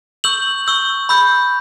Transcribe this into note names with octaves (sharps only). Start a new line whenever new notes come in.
C#6 E6 G6 F#7
C#6 E6 G6
B5 E6 G6